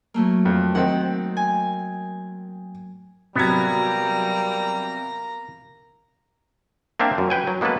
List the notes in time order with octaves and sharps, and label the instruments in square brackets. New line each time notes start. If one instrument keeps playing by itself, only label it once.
[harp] F#3 A3 A#3
[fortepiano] F2
[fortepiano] D#3 C4 [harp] F#5
[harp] G#5
[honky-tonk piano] C3 F#3 G#6 [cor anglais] G3 [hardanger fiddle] A#3 A#5 [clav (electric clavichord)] B3
[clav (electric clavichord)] A#3 C4 D4 E5 F5 G5
F#2
B4 G5 G#5
F#3
G#3 A#3 B3 C#4 A4 B4